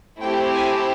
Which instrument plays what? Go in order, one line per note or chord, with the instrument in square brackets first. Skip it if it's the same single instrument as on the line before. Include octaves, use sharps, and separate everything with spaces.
[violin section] A3 C4 E4 G4 G5
G#5